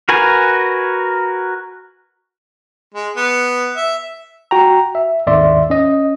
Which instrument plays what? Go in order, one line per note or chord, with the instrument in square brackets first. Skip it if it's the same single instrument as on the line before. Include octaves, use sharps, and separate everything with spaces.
[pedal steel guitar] F#4 A#4 B4 G#5
[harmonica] G#3
B3
E5
[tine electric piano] F#4 G5 A#5
E5
G#1 D#2 D5 E5 C6
C#4 D#5